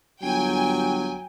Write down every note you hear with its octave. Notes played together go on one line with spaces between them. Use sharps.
G1 F#3 G5 G#5